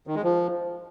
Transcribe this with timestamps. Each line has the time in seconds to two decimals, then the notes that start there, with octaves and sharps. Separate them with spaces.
0.07 D#3
0.15 G#3
0.24 F3